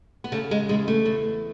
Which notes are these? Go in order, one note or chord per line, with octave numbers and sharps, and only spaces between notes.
B3
C#3 A3
G#3
E2 G#3
A3
E2